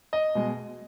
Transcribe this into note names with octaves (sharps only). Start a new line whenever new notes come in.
D#5
B2 G#3